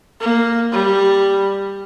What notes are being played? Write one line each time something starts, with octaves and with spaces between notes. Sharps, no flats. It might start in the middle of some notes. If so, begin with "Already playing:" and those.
A#3
G3